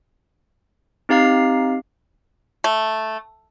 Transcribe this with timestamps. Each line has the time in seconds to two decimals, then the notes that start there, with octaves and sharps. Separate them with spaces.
1.09 C4 D#4 G4 F5 A#5 C7
2.64 A3